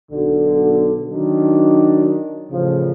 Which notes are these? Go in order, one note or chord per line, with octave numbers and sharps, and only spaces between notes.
B1 D3
D#3 F#3 D4 D#4
A1 C#3 F3